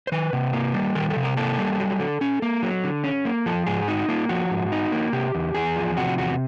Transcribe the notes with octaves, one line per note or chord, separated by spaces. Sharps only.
C5
D#3 B4
C3
A#3
G3
D#3 A#4
A4
C3
A#4
A#3 A4
G3
F#3
D3
C#4
A#3
F#3
D3
C#4
A#3
F3 A4
G#2 G#4
D#4 F#4
A#3 F4
F3 F#4
G#2
D#4
A#3
C3 G4
E2
E2 G#4
F3
C3 F#4
E2 F#4